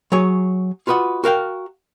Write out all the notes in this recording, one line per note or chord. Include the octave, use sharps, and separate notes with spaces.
F#3 G#4 C#5 G#5
F4 F#4 B4 D#5 F#5
F#4 A#4 F5 G5